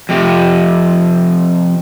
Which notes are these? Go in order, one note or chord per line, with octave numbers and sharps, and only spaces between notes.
F2 C3